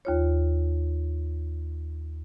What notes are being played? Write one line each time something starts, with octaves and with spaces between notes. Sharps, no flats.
D#2 F4 C#5